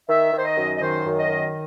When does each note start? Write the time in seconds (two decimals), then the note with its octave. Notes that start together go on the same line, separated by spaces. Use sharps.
0.09 D#3 E5
0.33 D#3 C5
0.45 D#5
0.57 F#2
0.75 D#5
0.81 D#3 C5
1.05 F#2
1.17 D#5
1.29 D#3